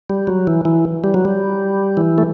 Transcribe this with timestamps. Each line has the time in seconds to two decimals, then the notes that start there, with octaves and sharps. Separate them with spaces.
0.10 G3
0.27 F#3
0.47 E3
0.65 E3
1.04 G3
1.14 F#3
1.25 G3
1.97 E3
2.18 A3